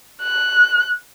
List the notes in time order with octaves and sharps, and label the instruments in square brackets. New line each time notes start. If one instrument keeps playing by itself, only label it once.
[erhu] F#6